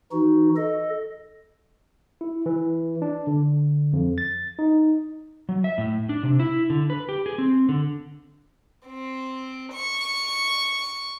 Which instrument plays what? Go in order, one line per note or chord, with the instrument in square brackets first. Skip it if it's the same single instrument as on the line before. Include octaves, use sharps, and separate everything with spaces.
[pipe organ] E3 D#4 F#4
A4 D#5
[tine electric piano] E4
E3
D4
D3
F2
A6
D#4
[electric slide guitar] F#3
E5
A2
D4
C3
E4
D3
B4
G4
G#4
C4
D3
[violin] C4
C#6